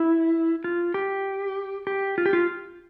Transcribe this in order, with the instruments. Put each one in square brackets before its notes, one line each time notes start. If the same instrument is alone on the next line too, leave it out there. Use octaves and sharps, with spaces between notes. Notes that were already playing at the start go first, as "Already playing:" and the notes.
Already playing: [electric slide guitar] E4
F4
G4
G4
F4
G4
F4